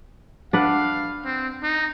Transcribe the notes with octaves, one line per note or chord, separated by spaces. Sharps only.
D4 B4 F5 F#5
C4
D#4